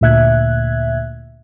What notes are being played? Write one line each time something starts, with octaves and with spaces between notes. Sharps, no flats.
D2 A#2 E5 F#6 G#6